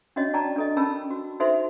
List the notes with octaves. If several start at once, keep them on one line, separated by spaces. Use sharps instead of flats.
C#4 D4 F#4 C#5 D#5
D5 G5 A5 A#5
D4 A4 D#5
C#4 A#4 A5 B5 E6
F#4
D#4 F#4 A4 C5 E5 C6